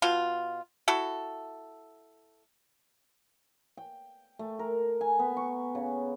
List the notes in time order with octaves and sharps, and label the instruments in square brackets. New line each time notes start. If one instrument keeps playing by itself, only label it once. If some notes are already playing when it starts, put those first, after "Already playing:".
[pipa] B2 F4
E4 F#4 A4
[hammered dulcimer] G5
A3
A#4
G#5
B3
C#6
C#3